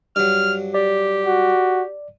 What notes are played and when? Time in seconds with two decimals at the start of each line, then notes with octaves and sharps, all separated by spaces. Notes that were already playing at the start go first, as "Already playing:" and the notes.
0.16 G2 F#3 F6
0.74 G4 D5
1.27 F#4